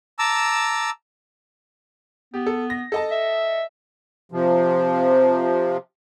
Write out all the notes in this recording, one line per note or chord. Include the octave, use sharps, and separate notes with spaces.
A5 A#5 D6 E6
B3 G4
A4
A#6
A4 D#5 A5
E5
C3 F3